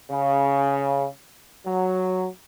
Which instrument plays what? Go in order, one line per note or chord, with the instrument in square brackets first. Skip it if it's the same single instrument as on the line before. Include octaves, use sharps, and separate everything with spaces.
[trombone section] C#3
F#3